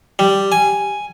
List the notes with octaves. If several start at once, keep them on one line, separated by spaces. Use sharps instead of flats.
G3
G#5